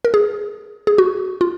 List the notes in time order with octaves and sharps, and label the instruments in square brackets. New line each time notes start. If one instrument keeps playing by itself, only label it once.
[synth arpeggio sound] A#4
G#4
G#4
F#4
F4